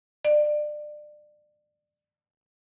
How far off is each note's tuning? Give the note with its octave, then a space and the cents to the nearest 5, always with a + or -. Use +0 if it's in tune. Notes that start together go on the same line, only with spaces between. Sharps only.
D5 +25